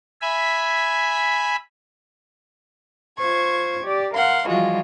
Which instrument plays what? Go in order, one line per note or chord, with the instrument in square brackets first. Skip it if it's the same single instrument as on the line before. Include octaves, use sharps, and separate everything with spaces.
[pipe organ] E5 G#5 B5
[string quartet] F4 C5 C#6 G#6
G4 D5
A#4 F5 F#5 C6
E3 F3 G3 G#3 F4 F#4